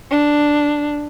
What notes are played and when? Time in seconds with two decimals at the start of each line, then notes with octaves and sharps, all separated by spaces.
0.11 D4